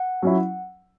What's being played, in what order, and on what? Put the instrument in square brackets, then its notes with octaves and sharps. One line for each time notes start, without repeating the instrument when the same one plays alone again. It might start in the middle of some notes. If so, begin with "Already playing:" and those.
Already playing: [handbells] F#5
[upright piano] F#3 C#4 E4